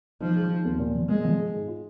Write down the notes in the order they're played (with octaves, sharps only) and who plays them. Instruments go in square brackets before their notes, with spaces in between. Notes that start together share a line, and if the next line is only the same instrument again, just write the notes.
[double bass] F3 [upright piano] D#4
[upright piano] G#3
D#4
D#2
A#2
F3
[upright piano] A#2 [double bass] G#3
[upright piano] F3
G#3
G#2
F4